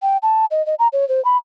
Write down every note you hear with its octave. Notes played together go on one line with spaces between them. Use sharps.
G5
A5
D#5
D#5
A#5
C#5
C5
B5